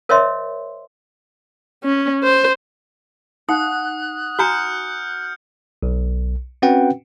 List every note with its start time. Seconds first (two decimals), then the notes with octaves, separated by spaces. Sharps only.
0.09 A#4 C5 C#5 D#5 E5 C6
1.83 C#4
2.23 C5
3.49 D#4 F#5 D#6 F#6
4.39 F#4 G#5 A#5 F6 G6 C#7
5.83 B1
6.62 C4 C#4 F#4 B4 F#5 G5